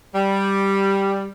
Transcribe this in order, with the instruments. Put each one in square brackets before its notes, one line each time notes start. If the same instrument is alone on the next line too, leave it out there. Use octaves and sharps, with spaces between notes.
[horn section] G3